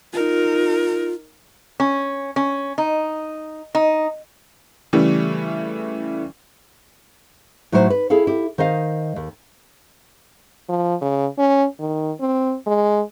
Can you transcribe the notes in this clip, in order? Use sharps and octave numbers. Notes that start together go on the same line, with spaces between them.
D#4 F4 A#4
C#4
C#4
D#4
D#4
C#3 E3 G3 A3
A2 F#3 D#4 F#4 G#4 C5
B4
E4 G#4 A4 F5
E4 G4
D#3 C5 D#5 F5
D#2
F3
C#3
C#4
D#3
C4
G#3